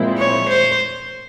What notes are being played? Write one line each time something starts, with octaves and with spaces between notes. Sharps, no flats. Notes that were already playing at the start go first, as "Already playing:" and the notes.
Already playing: A#2 F3 G#3 C4 E4
C#5
C5